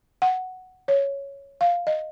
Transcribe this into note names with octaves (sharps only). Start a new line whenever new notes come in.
F#5
C#5
F5
D#5